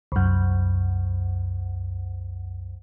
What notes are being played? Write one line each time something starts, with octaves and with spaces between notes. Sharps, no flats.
C2 F#2